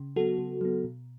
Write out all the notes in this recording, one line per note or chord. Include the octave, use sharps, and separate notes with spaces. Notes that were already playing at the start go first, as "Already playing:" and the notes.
Already playing: C#3
F#3 B3 F#4 A4
C#3
F#3 B3
B2